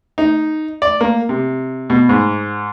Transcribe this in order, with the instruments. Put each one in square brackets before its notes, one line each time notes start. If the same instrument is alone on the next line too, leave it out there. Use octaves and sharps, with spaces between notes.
[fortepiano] D#4
D5
A#3
C3
B2
G#2